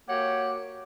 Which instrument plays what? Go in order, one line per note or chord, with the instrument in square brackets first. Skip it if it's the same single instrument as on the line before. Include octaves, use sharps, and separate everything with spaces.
[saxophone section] A#3 F#4 G4 C#5 F#5